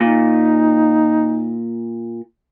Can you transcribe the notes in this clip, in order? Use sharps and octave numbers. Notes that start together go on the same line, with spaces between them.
A#2 D#4